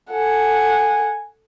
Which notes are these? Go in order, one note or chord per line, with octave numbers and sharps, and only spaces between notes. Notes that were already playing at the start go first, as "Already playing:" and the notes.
A4 F#5 G#5